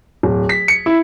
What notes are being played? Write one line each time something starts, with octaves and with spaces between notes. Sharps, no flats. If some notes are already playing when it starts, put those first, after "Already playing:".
D1
B6
C#7
E4